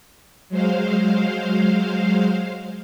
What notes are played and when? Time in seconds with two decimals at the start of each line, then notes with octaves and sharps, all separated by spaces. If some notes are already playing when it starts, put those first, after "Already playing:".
0.49 F#3 G#3 C5 F5